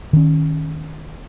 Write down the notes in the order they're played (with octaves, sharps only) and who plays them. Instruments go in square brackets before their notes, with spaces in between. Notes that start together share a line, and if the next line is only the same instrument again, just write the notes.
[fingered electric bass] D#3 C#4